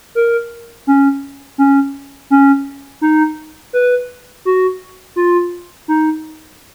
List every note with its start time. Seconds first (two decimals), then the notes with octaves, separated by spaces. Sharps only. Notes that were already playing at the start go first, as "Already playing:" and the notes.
0.15 A#4
0.87 C#4
1.58 C#4
2.30 C#4
3.01 D#4
3.73 B4
4.45 F#4
5.16 F4
5.88 D#4